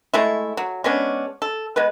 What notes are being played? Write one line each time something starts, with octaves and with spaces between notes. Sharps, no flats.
G#3 A3 E4
F#3
G#3 B3 C#4 D4
A4
G#3 B3 B4